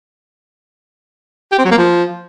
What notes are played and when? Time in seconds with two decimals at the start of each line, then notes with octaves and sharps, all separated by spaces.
1.52 G4
1.58 C4
1.65 F#3
1.71 A#3
1.78 F3